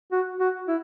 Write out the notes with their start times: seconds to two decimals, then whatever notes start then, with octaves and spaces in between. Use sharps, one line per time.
0.12 F#4
0.40 F#4
0.68 E4